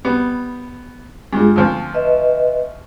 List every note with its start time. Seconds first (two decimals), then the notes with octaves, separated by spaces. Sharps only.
0.05 G3 B3
1.33 G2 G3 G#3 F4 G#4
1.56 D2 F3 A5
1.94 B4 D#5 E5